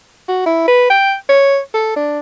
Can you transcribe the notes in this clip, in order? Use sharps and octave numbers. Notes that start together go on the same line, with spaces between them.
F#4
E4
B4
G5
C#5
A4
D4